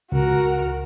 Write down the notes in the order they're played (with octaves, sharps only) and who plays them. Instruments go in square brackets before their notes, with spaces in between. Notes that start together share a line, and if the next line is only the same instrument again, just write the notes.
[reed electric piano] C#2 [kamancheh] F#4 A#4